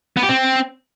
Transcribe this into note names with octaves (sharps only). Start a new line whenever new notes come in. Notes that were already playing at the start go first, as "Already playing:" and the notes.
B3
G4
C4